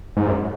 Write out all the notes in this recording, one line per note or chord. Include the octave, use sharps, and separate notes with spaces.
G#2
F#2